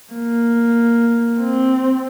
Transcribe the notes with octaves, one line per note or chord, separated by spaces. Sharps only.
A#3
C4